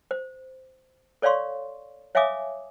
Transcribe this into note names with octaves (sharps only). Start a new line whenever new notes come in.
C5
A4 C#5 D5 F5 C6 C#6
C#5 E5 F5 G#5 D6 D#6